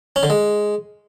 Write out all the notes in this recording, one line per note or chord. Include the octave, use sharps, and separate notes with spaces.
C#4
D3
G#3